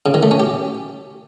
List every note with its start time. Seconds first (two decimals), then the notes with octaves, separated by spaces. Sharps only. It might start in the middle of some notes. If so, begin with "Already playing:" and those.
0.06 C#3
0.14 D#3
0.23 A3
0.31 C#4
0.40 G4